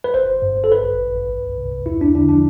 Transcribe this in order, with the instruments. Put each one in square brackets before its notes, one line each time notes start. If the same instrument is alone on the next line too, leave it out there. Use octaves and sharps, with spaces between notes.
[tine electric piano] B4
G1 C5
G1
G2
G1
A4
A1 B4
A1
A1
G2
C2
C2
C3
C2
E2 E4
E2 D4
D3 D4
F3 D4